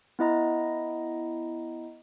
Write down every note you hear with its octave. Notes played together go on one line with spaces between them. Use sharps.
B3 E4 D#5 A#5